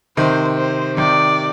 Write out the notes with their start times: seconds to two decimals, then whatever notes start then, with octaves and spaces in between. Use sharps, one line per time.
0.17 C3 D#3 C5
0.57 C5
0.97 C3 D#3 D5